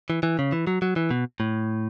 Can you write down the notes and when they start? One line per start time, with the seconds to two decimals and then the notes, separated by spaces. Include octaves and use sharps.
0.10 E3
0.23 E3
0.39 C#3
0.52 E3
0.67 F#3
0.82 F#3
0.96 E3
1.11 B2
1.40 A2